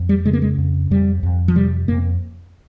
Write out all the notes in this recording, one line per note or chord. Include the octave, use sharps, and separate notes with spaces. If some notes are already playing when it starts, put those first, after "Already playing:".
Already playing: F2
G3
C#3 G#3
A#3
G#3
F2
F2 G3
F2
F3
C3 G3
F2 A#3